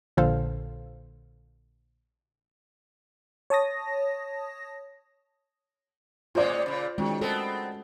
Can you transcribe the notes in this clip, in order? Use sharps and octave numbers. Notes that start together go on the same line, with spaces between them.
A#1 A#2 D3 A4 C5 F5
C#5 A5 D#6 A#6
A2 G#3 C#4 F4 C5 D5
A#2 C#3
D#3 G#3 C#4 F#4
B3 C4 A4 A#4